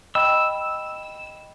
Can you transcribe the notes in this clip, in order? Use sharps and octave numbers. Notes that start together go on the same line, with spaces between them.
D#5 G5 B5 E6